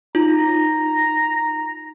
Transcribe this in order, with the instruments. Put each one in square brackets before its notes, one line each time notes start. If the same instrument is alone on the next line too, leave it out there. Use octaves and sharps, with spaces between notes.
[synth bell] D#4 [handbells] F4 [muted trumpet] A#5